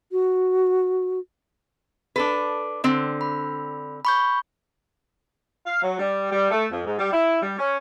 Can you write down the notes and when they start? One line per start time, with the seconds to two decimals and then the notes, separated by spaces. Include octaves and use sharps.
0.12 F#4
2.16 D4 A4 B4
2.84 D3 C4
3.21 B5
4.05 B5 C#6 G6
5.67 F5
5.82 F#3
5.99 G3
6.31 G3
6.51 A3
6.71 F2
6.85 G#2
6.99 G3
7.12 E4
7.42 G3
7.59 C#4